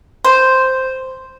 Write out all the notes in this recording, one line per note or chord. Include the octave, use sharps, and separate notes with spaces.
C5